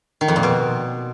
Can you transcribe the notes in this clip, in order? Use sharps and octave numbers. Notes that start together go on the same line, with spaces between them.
D#3
F2
A#2
B2